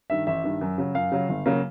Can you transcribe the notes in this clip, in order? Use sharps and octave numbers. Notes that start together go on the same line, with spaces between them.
G2 D#3 E5
A1 E5
G2 D#3
F#2
C#3 F#3
F#2 F5
C#3 F#3
G1
C#3 F#3 A#3